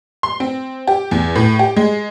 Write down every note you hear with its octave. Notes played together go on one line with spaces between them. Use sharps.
C6
C4
G4
E2
A2
G4
G#3